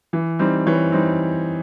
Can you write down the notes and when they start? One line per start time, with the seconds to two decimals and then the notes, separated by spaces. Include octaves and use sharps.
0.13 E3
0.39 G3 C4 D#4
0.67 E3 C#5
0.92 G3 C4 D#4